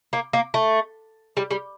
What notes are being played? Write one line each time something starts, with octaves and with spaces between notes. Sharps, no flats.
A#3
A#3
A3
G3
G3